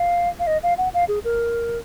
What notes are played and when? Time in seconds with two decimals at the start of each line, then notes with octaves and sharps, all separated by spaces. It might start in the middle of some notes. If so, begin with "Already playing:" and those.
Already playing: F5
0.39 F5
0.47 D#5
0.63 F5
0.78 F#5
0.94 F5
1.08 G#4
1.25 A#4